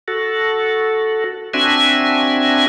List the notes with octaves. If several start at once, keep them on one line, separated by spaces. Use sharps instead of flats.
F#4 A4
C4 D4 F#4 E5 G#5